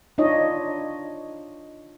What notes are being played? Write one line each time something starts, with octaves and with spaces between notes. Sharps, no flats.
D4 D#4 F4 C#5 D#5